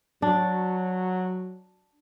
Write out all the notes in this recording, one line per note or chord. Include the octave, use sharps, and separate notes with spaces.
F#3 D4